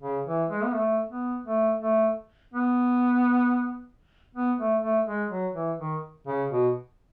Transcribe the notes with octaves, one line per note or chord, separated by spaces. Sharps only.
C#3
E3
G#3
B3
A3
B3
A3
A3
B3
B3
A3
A3
G#3
F#3
E3
D#3
C#3
B2